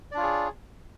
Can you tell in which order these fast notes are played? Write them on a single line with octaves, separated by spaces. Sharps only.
D5 D4 F4 C#5 G#4